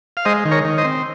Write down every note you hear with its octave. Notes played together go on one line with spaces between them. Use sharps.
F5
G#3 C5 D#5
D#3
A#4 C#5
D#3
C5 D#5
C4